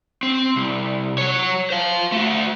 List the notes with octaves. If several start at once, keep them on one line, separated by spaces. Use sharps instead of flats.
C4
C2
F#3 C#5
C5 F5
A3 F#4